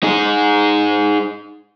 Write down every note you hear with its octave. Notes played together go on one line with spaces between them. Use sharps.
D#4 G#4